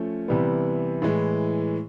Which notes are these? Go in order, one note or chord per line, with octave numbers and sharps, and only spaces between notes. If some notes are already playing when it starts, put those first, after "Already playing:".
Already playing: F3 A3 C#4
C3 E3 G3 B3
A2 E3 G#3